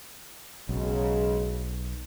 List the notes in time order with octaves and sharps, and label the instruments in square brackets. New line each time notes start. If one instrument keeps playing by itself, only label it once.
[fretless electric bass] B1 [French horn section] C#3 F#3 G#3